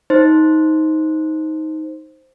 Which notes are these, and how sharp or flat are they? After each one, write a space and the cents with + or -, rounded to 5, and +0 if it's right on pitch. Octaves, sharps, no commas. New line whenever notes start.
D#4 +15 C5 +0